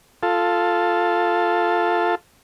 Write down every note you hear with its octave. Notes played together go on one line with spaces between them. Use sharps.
F4 A4